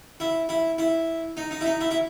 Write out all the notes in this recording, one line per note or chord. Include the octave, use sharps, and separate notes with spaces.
E4
E4
E4
D#4
D#4
E4
D#4
E4
E4